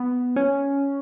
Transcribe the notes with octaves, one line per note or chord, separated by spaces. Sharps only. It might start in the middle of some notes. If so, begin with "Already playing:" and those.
Already playing: B3
C#4